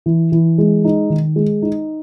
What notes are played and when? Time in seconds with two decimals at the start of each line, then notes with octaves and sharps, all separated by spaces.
0.06 E3
0.32 E3
0.58 G#3
0.85 D#4
1.10 D#3
1.36 G#3
1.62 D#4